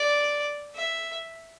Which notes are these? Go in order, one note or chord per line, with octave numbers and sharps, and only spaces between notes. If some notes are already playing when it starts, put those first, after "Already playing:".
Already playing: D5
E5